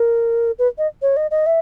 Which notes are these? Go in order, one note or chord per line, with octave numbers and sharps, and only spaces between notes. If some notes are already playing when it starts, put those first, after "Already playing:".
Already playing: A#4
B4
D#5
C#5
D#5
D#5
E5